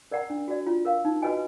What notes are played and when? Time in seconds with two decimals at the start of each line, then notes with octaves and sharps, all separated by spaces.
0.11 A#4 D5 F#5 A#5
0.30 D4
0.48 F#4 D5
0.66 F4
0.85 A#4 F5
1.05 D#4
1.22 F#4 B4 D#5 G#5